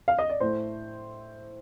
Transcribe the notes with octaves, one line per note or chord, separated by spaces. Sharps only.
F5
D#5
D5
A2 A3 C5